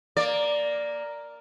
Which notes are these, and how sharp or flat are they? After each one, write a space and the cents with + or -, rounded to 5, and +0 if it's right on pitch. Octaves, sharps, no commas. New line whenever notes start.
A#3 +0 D5 +0